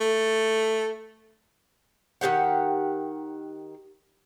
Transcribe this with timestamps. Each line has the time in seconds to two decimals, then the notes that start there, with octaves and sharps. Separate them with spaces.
0.01 A3
2.21 D#3 B3 G4 F#5